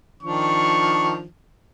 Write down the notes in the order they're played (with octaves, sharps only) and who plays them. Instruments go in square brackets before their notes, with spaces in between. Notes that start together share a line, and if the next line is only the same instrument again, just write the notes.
[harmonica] D#3 F3 D4 [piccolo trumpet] C#6